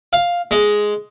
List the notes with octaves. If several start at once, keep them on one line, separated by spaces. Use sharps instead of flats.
F5
G#3